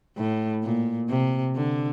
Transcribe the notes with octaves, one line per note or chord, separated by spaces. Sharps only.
A2
A#2
C3
D3